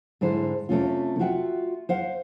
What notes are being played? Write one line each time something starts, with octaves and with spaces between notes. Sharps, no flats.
G#2 D3 E4 C5
C3 A3 C#4 F4
F4 F#4 E5 F#5 G5
C5 F5 F#5